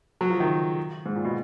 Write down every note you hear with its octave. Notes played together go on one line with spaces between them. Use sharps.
F#3
F3
D#3
G#2
A#2
B2